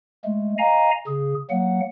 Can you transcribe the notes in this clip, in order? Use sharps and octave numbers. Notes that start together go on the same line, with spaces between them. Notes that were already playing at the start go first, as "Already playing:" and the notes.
G#3 A3
D#5 F5 G#5 A#5
C#3 G#4
F#3 A#3 F#5